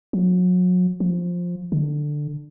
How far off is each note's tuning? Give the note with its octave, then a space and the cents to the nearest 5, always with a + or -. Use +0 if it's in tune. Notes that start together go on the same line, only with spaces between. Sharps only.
F#3 -35
F3 +10
D3 +10